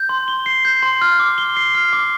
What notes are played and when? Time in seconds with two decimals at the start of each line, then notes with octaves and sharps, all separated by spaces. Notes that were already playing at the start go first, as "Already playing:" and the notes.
Already playing: G6
0.09 C6
0.28 G7
0.46 C7
0.65 G6
0.83 C6
1.01 F6
1.19 D6
1.38 G7
1.57 C7
1.74 F6
1.93 D6